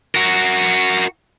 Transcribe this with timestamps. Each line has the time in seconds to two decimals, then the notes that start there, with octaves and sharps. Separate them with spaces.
0.15 F#4 A#4